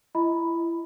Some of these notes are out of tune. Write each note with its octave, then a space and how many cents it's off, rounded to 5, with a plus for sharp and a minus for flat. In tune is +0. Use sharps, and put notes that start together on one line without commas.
E4 +30 D#5 +30 B5 +0